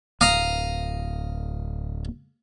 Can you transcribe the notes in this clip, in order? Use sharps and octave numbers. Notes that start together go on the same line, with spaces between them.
D1 F5 A#5 D#6